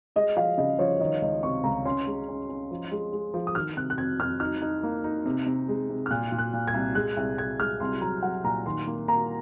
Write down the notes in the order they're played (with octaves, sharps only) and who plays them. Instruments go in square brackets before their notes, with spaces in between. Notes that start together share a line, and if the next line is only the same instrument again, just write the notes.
[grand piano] G#3 [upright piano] D#5
[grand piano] F3 [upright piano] F5
[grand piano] C#3 [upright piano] D#5
[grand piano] F3 [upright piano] C#5
[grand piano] D#3 [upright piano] D#5
[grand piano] C#2 [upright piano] D#5
[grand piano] C3 [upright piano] C#6
[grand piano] C#2 [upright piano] A#5
[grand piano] C#4 [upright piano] C6
[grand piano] G#3
C#4
C#4
F3
G#3
G#3
F3
[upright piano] D#6
[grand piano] D#3 [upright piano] F6
[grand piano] C3 [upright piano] F#6
[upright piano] F#6
[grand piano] F2 [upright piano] G#6
[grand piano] F2 [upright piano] F6
[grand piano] D#4 [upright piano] F6
[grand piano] D#4
A#3
D#4
C3
C3
G#3
C3
[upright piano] F6
[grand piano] A#2 [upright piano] F#6
[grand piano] A#2
[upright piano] F#6
[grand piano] A#2
[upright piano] G#6
[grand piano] C2
[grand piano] G#3 [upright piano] F#6
[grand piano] C2
[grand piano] C2 [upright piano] G#6
[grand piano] G#3 [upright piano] F6
[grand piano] C2 [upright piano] C6
[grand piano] F#3 [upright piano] A#5
[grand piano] F#3 [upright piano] F#5
[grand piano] A#2 [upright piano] A#5
[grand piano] D#3 [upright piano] C6
[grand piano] A#3
[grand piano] A#3 [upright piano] A#5